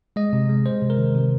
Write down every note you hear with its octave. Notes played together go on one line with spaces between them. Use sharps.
G#3 D#5
C3
G#3
G#3 C5
C3
A#4
D#3
C3